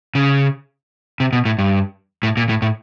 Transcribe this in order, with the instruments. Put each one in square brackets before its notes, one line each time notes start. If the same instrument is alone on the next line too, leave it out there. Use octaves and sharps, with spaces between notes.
[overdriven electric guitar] C#3
C3
B2
A2
G2
A2
A#2
A2
A2